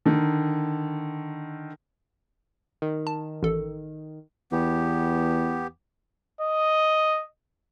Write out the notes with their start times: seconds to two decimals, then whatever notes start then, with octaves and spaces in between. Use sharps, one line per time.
0.06 D3 D#3
2.82 D#3
3.07 A5
3.43 A1 A4
4.52 E2 B3 G4
6.41 D#5